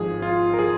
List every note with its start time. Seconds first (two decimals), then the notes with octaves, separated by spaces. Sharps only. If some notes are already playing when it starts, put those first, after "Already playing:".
Already playing: G#1 G#2 F3 G#4
0.22 F4
0.54 A#4
0.59 F3 G#4